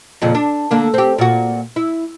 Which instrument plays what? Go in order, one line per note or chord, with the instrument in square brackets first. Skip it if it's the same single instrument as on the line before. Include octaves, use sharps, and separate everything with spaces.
[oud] F2 A#2 C#3
D4
D3 A#3 D4
C4 G4
A#2 F#4
E4